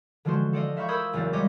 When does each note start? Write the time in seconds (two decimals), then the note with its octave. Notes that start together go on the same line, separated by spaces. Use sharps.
0.25 D3 E3 F3 G#3 F#4 C5
0.53 A4 D5 D#5 F5
0.76 C5 E5 F5 B5 C#6 G6
0.88 A#4 C5 B5 D#6 E6 G#6
1.13 F#1 E2 E3 F#4 F5 A6
1.33 G3 G#3 C#5 D#5 D6